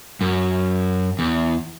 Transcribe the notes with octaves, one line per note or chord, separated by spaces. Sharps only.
F#2
E2